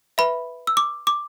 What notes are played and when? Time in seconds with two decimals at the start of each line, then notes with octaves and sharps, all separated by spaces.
0.18 B4 E5 B5
0.67 E6
0.77 D6
1.07 D6